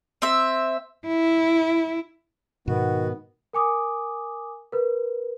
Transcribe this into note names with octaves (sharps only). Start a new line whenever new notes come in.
C4 E5
E4
G#2 B2 D#3 B3 F#4
A#4 G#5 D6 D#6
A#4 B4